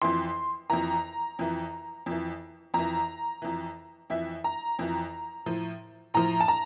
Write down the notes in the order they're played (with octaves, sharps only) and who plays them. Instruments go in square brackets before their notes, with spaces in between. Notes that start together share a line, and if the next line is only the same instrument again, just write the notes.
[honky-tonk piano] F2 E3 C6
F2 E3 A#5
F2 E3
F2 E3
F2 E3 A#5
F2 E3
F2 E3 E5
A#5
F2 E3
A2 F3
A2 F3 A#5
A5
A#5